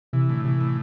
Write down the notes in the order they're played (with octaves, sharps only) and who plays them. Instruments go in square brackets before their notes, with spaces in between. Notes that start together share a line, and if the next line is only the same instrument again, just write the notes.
[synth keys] C3 [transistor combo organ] E3
[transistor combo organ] A2 [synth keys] D3
[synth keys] C3 [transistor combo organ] E3
[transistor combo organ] A2